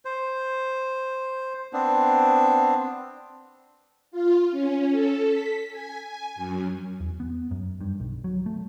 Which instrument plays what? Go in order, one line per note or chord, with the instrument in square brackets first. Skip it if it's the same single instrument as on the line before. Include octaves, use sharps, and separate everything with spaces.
[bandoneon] C5
B3 C4 D4
[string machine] F4
C#4
A4
B6
G#5
G#5
F#2
[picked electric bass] E2
B3
F#2
G2
B1
F#3
A3